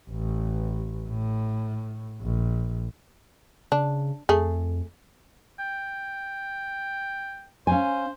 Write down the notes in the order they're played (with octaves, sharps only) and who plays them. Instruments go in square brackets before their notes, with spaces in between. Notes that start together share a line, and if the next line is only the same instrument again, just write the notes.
[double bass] A1
A2
A#1
[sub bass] C#3 [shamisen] D4
[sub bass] F2 [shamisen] A3 G#4
[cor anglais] G5
[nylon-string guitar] C#4 F5 G#5 [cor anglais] C5